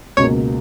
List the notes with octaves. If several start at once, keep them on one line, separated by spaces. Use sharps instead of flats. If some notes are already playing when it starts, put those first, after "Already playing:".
C#2 B2 A#3 C#5